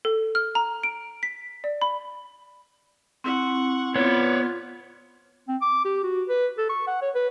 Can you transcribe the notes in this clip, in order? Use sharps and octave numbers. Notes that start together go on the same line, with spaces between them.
A4
F6
A#5
D7
B6
D5
B5
C4 E4 F#5 C#6
B3 F4 C#5 D5
C4
D6
G4
F#4
B4
A4
C#6
F#5
C#5
B4